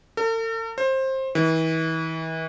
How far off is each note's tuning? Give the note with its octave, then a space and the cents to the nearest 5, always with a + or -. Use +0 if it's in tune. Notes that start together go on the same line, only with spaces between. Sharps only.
A4 +45
C5 +20
E3 -35